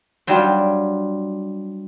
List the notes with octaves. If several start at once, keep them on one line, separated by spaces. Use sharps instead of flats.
F#3 G3 D4 F4